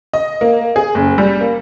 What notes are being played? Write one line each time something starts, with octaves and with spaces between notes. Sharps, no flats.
D#5
A#3
G#4
F#1
G3
A#3